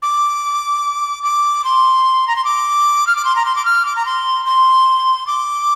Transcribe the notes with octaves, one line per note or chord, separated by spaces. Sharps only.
D6
D6
C6
A#5
C6
D6
F6
D6
C6
A#5
C6
D6
F6
D6
A#5
C6
C6
D6